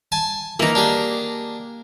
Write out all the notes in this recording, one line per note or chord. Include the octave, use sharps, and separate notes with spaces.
G#5 A5
E3 A#3 D#4 A#5
D4 G4 G#4